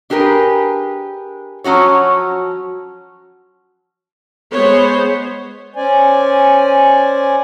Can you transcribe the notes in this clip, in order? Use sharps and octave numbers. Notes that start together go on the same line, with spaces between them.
D4 G4 G#4 A#4 B4
F3 F#3 C#4 F#4 C#5
G#3 B3 C5 C#5
C#4 C5 D5 G#5